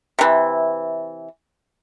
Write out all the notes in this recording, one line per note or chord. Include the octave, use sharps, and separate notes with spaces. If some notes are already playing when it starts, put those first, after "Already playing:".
C3 E3